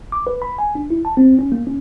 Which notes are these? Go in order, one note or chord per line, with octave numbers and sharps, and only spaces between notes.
D6
B4
B5
G#5
D4
E4
A5
C4
C#4
A#3
C#4